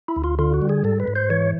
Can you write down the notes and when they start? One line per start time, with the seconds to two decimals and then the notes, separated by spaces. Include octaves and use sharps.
0.08 E4
0.16 D2
0.24 F4
0.39 D3 F4
0.54 F#4
0.62 G3
0.69 G#4
0.84 G#2 A4
1.00 B4
1.07 G#2
1.15 C5
1.30 E3 C#5